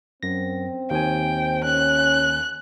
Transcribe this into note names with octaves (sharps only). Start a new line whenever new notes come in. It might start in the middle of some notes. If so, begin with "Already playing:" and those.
F#2 C4 A#6
D#2 G5 G#5
C#4 F#6